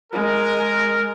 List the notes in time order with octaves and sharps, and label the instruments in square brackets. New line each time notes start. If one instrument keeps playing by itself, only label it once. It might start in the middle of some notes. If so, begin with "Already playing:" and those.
[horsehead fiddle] G#3 [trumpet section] A#4